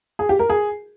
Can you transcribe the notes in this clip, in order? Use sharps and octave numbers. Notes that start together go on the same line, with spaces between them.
G#4
G4
A#4
G#4